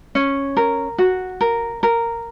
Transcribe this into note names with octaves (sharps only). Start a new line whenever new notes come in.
C#4
A#4
F#4
A#4
A#4